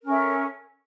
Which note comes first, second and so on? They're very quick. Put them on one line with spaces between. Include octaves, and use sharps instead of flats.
A#4 C#4 A4 E5